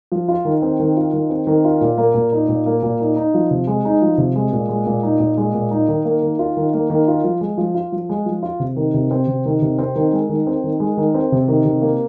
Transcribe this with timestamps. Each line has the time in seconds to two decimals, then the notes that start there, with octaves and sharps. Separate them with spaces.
0.12 F3
0.28 F4
0.45 D#3
0.62 C4
0.80 D#3
0.97 F4
1.13 D#3
1.30 C4
1.47 D#3
1.64 F4
1.81 A#2
1.98 A#3
2.14 A#2
2.32 D#4
2.49 A#2
2.66 A#3
2.83 A#2
3.00 D#4
3.16 D#4
3.34 F3
3.51 C3
3.67 G#3
3.85 D#4
4.02 F3
4.18 C3
4.36 G#3
4.53 A#2
4.69 G#3
4.86 A#2
5.03 D#4
5.20 A#2
5.37 G#3
5.54 A#2
5.71 D#4
5.88 D#3
6.05 A#3
6.23 D#3
6.39 F4
6.57 D#3
6.74 A#3
6.90 D#3
7.08 F4
7.24 F3
7.41 G#3
7.58 F3
7.74 F4
7.92 F3
8.09 G#3
8.26 F3
8.43 F4
8.60 C3
8.76 D#3
8.94 C3
9.11 C4
9.27 C3
9.45 D#3
9.62 C3
9.79 C4
9.96 D#3
10.12 G#3
10.29 D#3
10.47 C4
10.64 D#3
10.80 G#3
10.97 D#3
11.14 C4
11.32 C3
11.48 D#3
11.65 C3
11.82 A#3